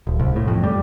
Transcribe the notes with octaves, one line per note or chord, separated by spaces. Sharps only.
D1
C2
A2
F2
G3